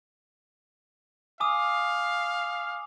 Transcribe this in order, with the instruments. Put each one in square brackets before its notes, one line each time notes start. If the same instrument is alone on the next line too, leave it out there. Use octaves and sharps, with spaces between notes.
[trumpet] F5 [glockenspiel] G#5 D6 D#6